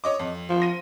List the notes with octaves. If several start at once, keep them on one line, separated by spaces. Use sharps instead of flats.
C#5 D#5 D6
F2
F3
A#6 D#7